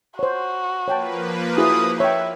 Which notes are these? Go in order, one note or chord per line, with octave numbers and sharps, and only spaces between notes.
F#4 C5 C#5
F3 A#3 B4 C#5 G5 A5
E4 F#4 G#4 D#6
C#5 E5 G5